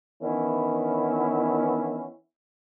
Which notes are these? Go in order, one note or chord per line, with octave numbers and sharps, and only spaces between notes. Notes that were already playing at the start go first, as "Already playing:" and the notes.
D#3 E3 B3 C#4 D4 E4